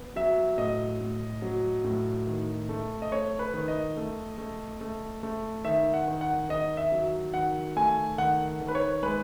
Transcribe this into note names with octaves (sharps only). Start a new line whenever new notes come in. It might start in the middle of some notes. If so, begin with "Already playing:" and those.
Already playing: B3
F#3 E5
A2 D#5
A2
F#3
A2
D#3
A3
D#5
A3 C#5
B4
D#3
D#5
A3
A3
A3
A3
D#3 E5
F#5
D#3
F#5
D#3 D#5
E5
F#3
D#3 F#5
A3 G#5
D#3 F#5
D#3
B4
C#5
G#3 B4